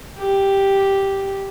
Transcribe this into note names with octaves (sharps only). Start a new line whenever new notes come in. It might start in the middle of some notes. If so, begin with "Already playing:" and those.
G4